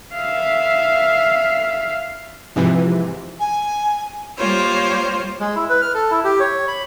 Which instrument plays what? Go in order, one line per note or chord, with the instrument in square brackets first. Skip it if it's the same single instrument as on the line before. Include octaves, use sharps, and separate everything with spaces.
[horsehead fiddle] E5 F5
[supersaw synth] G#2 C3 E3 [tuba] F3
[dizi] G#5
[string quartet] G3 A#3 F4 C5 C#5
[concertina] G#3
E4
B4
F6
A4
E4
G4
C#5
B5